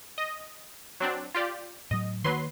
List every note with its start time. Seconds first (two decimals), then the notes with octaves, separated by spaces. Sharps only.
0.18 D#5
1.00 F#3 C4 D4
1.34 F4 G4 D5
1.91 A2 F#3 D#5
2.24 D#3 F#3 A#3 B4 C6